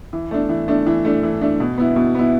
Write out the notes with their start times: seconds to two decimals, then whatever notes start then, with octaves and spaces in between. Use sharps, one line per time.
0.13 E3
0.31 A3 D4
0.49 E3
0.68 A3 D4
0.86 E3
1.05 A3 D4
1.23 E3
1.41 A3 D4
1.60 B2
1.78 B3 E4
1.96 B2
2.15 B3 E4